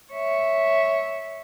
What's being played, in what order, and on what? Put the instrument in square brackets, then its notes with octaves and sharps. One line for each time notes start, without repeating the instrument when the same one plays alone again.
[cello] C#5 E5